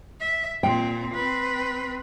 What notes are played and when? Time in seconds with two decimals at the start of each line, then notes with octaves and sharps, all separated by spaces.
0.20 E5
0.63 A#2 C4 G5
1.14 C4 B4